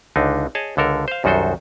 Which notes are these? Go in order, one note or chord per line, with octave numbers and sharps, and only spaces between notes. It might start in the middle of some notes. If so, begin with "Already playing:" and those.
C#2 D3 D4 D#4
G#4 C#5 D#5 A5
C#2 D3 A4 A#4
C5 F5
C2 F#2 D#3 F#4 A4 C5